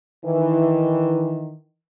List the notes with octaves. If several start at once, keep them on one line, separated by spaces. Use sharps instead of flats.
D#3 E3